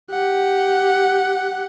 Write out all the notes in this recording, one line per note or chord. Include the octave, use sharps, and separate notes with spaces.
G4 F#5